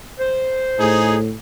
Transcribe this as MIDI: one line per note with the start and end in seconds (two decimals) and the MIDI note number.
0.19 1.24 72
0.79 1.34 45
0.79 1.16 63
0.79 1.16 68